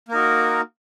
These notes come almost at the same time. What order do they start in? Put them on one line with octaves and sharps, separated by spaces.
A#3 A#4 D#4 F#4